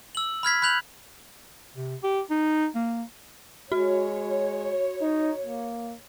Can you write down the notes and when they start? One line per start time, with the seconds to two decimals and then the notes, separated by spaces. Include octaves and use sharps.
0.15 E6 F#7
0.43 B5 F6 G#6 B6
0.62 B5 F#6 G6 F7 F#7
1.76 C3
2.03 G4
2.30 D#4
2.75 A#3
3.72 G#3 F#4 C#5
5.02 D#4
5.45 A#3